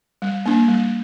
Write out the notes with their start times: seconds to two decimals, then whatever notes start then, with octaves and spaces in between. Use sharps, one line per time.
0.22 G3
0.46 A#3 D4
0.68 G3